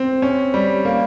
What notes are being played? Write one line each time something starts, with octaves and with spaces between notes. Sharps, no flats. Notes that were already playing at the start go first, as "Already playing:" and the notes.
Already playing: C4
C#4
G3
A#3